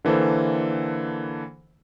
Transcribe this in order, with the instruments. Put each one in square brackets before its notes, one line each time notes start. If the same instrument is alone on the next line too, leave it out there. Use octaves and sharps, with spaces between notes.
[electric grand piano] D3 E3 A#3 A4 C5